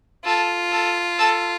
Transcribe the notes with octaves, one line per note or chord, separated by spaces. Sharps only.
F4 A4
A4
A4